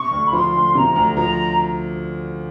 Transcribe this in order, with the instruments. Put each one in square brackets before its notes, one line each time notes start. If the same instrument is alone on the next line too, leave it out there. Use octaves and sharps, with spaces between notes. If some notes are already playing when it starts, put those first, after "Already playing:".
Already playing: [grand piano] C3 [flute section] C#6
[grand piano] D2
[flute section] B5
[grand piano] F3 [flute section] C6
[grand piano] D2
[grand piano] C3 [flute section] A#5
[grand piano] D2
[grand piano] F3 [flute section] A#5